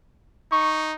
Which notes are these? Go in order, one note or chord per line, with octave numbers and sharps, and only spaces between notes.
D#4 C#6